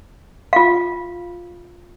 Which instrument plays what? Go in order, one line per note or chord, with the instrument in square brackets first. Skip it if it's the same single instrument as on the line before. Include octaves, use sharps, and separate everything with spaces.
[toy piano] F4 F5